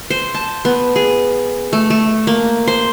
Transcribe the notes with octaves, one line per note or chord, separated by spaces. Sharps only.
C5
A5
B3
G#4
A3
A3
A#3
C5